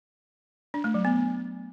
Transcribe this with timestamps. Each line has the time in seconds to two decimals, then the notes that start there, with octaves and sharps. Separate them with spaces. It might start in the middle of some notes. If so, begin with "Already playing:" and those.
0.74 D4
0.84 A3
0.94 F#3
1.05 B3